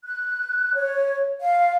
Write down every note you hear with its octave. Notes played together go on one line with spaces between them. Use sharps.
F#6
C#5
F5